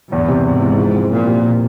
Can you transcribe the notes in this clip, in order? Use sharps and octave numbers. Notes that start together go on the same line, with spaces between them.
E2 G2
C3
E2 G#2
E3
F3
C4
A#2 F3
G4